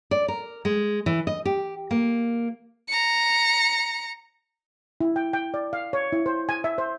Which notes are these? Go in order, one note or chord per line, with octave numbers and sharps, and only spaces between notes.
D5
A#4
G#3
E3
D#5
G4
A#3
A#5 C#7
E4
G5
G5
D5
F5
C#5
E4
C5
G#5
E5
C5